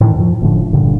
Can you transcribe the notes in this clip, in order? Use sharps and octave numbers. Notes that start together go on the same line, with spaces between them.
A2 D#3 E3
F2 F3
F#1 A2 D3 F3
F#1 G2 A#2 D3